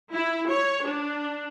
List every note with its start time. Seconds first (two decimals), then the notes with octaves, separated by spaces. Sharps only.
0.13 E4
0.50 C#5
0.87 D4